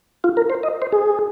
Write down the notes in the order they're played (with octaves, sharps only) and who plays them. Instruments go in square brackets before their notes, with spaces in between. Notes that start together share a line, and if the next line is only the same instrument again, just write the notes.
[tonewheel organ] F4
A#4
C5
D#5
C5
G#4